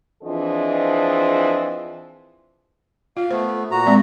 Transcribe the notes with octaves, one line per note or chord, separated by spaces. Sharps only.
E3 F3 C4 D4 G#4 D#5
F4 F5
A3 B3 C5
A#2 F#4 A#5
G#3 C4 D5